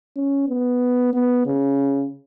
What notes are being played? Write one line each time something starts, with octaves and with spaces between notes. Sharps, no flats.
C#4
B3
B3
C#3